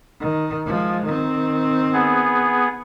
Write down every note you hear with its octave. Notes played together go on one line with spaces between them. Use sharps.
D#3
F3 G#3
D#3 C4
B3 G#4